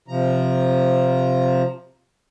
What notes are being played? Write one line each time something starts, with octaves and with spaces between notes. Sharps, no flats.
C3 F3 A#5